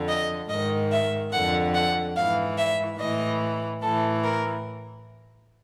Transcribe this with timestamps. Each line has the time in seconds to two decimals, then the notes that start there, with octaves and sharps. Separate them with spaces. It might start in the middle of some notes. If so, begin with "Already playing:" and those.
Already playing: F2 D3
0.09 D#5
0.50 G#2 D#3 D#5
0.93 E5
1.33 F2 D3 F#5
1.75 F#5
2.16 G#2 E3 F5
2.58 E5
3.00 A2 E3 D#5
3.83 A2 E3 A4
4.24 A#4